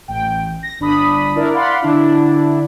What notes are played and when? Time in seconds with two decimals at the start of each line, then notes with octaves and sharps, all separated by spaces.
0.08 A1 G5
0.63 A#6
0.80 G1 D4 B5 D#6
1.35 D4 E4 A#4 D5
1.53 D5 F5 F#5 B5 C6
1.82 D3 D4 E4